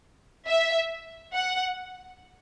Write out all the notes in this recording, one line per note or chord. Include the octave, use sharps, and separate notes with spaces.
E5
F#5